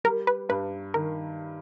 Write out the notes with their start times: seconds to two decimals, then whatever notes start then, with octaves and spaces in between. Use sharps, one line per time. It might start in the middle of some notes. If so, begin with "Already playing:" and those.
0.04 G3 A#4
0.27 B4
0.49 G2 B4
0.94 D#3 A#4